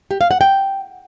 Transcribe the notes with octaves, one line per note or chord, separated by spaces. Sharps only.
G4
F5
F#5
G5